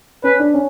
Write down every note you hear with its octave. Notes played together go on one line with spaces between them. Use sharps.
C#4 B4
D4
C#4